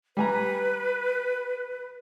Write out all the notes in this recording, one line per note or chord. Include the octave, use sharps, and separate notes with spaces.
G3 B4 G#5 A#5